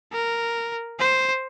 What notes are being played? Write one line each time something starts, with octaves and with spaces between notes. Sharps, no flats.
A#4
C5